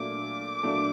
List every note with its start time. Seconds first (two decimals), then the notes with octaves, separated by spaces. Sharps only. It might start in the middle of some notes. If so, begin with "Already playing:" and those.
Already playing: A#2 F#3 A3 D4 D6
0.63 A#2 F#3 A3 D4